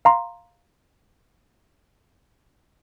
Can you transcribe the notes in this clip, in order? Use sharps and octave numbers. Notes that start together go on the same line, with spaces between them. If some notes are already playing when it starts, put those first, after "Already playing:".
F5 A#5 C6